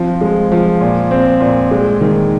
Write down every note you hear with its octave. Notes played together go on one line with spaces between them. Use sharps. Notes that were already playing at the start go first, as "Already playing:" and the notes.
Already playing: F3 C4
G#3
F3
A#2
C4
A#2
G#3
D#3